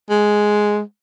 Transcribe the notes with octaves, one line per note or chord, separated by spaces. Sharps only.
G#3